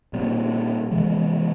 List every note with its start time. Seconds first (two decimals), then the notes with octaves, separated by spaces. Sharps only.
0.13 A#2 G3 C4
0.91 C3 E3 G#3